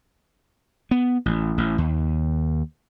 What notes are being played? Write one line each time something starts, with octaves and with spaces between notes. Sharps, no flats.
B3
A1
A1
D#2